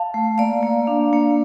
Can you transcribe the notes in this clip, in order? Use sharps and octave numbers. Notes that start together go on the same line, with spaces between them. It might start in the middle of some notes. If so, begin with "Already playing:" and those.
Already playing: F5 A5
A3
A#3 D5 F5
A#3
D4
A#3